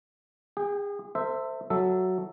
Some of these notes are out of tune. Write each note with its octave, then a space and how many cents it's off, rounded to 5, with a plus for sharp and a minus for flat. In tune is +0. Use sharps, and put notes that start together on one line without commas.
G#4 -35 G5 +0
A4 +45 C5 -5 E5 +0
F#3 +0 A4 +0 E5 +0